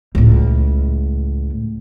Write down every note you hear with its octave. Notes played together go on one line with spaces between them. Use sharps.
C#2 A2